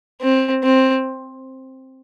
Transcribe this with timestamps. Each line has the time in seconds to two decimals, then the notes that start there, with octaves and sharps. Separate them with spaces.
0.21 C4
0.63 C4